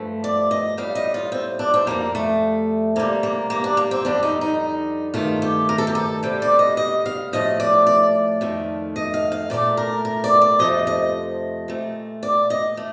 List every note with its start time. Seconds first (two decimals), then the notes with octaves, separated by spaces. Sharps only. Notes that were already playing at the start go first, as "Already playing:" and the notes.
Already playing: G2 F3 A3
0.24 D5
0.51 D#5
0.77 A2 G3 F5
0.95 D#5
1.14 F4
1.32 C4
1.59 D4
1.74 C4
1.87 F2 D#3 G3 A#3
2.15 A3
2.96 C3 G3 A#3
3.23 A#3
3.50 A#3
3.64 D4
3.77 A#3
3.91 C4
4.05 F2 D3 G3 D4
4.23 D#4
4.41 D#4
5.14 G2 D#3 A3 F4
5.42 G4
5.69 A#4
5.78 A4
5.87 G4
5.95 A4
6.23 C3 G3 G5
6.42 D5
6.59 D#5
6.77 D#5
7.06 F5
7.33 A2 F3 A3 D#5
7.60 D5
7.87 D5
8.41 F2 D#3 A3
8.96 D#5
9.14 F5
9.32 F5
9.50 A#2 A3 D5
9.77 A#4
10.05 A#4
10.24 D5
10.42 D5
10.59 F2 C3 F3 A3 D#5
10.87 D#5
11.68 A#2 A3
12.23 D5
12.50 D#5
12.77 A3